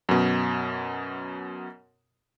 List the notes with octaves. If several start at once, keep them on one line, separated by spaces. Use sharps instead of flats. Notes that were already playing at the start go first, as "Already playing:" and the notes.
F#2 B2